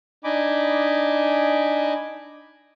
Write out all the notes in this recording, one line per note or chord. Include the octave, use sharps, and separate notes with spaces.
D4 D#4 D#5 G#5 B5 D6